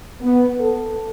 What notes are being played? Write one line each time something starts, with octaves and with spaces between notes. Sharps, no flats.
B3
A4